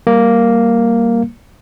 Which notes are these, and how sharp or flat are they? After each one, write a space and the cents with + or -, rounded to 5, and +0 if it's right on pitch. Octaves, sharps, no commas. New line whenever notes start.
G3 +0 A#3 +0